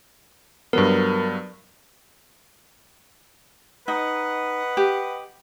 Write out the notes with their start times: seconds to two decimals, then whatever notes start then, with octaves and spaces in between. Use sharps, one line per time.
0.73 G2 F#3 B3 A#4
3.88 D#4 B4 D#5 F#5
4.77 G4